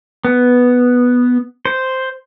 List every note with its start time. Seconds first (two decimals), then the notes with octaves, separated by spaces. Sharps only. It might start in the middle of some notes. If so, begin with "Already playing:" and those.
0.25 B3
1.65 C5